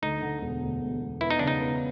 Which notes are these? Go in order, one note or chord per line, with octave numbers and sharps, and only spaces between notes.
D2 D#4
D3
E1
D2
E1
E1
B3 E4
D#4
C#3 D4
D#4
B3